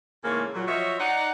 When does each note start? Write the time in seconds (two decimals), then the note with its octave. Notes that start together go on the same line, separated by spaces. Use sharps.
0.25 G#2 C#3 E3 A3 A#3 C#4
0.54 A#2 F#3
0.68 F3 F#4 C#5 D#5 E5
1.00 D#4 D5 F#5